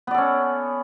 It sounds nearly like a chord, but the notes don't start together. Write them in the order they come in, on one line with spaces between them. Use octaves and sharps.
B3 D5 A4 C#4